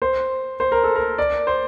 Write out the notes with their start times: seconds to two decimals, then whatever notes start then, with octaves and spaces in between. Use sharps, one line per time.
0.02 C5
0.60 C5
0.72 A#4
0.84 A4
0.96 A#4
1.18 D5
1.47 C5